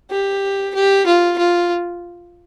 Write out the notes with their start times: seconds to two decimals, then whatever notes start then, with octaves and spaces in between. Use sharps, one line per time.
0.10 G4
0.74 G4
1.06 F4
1.38 F4